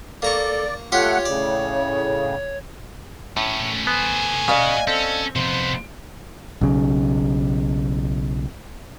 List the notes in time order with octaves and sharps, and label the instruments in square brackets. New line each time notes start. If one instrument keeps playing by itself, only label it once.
[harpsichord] A#3 A#5 C#6 [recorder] A4 [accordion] D5
[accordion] A3 F#5 [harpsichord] F4 G4 F5 [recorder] C#5
[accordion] A2 C#3 [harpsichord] D5
[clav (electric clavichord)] A2 [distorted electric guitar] A3 C#4
[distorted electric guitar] A3 C5 [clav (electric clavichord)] B3 [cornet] G#5
[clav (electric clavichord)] C#3 [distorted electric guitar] B3 F#4 [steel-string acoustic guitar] D5 D#5 F5
[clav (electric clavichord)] C4 [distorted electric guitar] C#4 [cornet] A4
[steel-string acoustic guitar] F2 [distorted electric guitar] C3 B3 [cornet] C5
[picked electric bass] B1 C#3